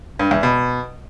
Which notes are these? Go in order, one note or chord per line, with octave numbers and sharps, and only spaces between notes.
G2
E2
B2